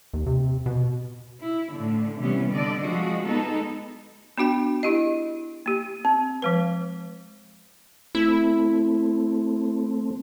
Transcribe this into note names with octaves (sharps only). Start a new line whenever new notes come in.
D#2
C3
B2
E4
A2 D3
C3 E3 G3 B3 C#4
D3 D5 D#5
F3 G#3 C4 F#4
G#3 B3 D#4 A4
B3 D4 F#4 G5
E4 G4 D#5
A#3 G4
C4
F3 G#3 B4
A3 C4 E4